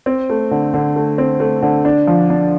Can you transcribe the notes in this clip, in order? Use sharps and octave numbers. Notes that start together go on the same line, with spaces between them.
C4
A3
D3
D3
A3
C4
A3
D3
D4
F3
D4